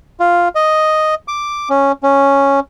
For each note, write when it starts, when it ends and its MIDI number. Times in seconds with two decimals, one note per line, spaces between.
0.20 0.48 65
0.55 1.15 75
1.28 1.69 86
1.69 1.92 61
2.03 2.60 61